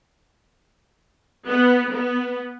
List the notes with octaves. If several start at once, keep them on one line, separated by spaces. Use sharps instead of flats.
B3
B3